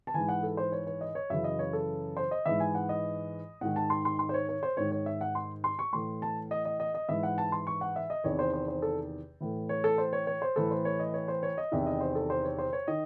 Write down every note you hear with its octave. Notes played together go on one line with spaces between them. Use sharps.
A5
G#2 E3 G#5
F#5
A4
C5
C#5
C#5
D#5
C#5
F#2 C#3 E3 E5
D#5
C#5
A4
C5
D#5
G#2 E3 E5
G#5
F#5
D#5
G#2 D#3 F#5
A5
C6
C6
C6
C5
C#5
C#5
C5
G#2 D#3 C#5
C#5
E5
F#5
C6
C6
C#6
A2 E3 C6
A5
D#5
D#5
D#5
D#5
G#2 E3 E5
F#5
A5
C6
C#6
F#5
E5
D#5
E2 C3 D#3 C#5
C5
C5
C5
A4
A2 E3
C#5
A4
C5
C#5
C#5
C5
A2 E3 A4
C5
C#5
D#5
C#5
C5
C#5
D#5
E2 C3 D#3 E5
D#5
C5
A4
C5
C#5
C5
C#5
D#3 D#5